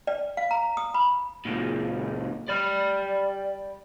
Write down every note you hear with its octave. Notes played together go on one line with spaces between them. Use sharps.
D5
F5
A#5
D#6
B5
C#2 A#2
G3 D5 B5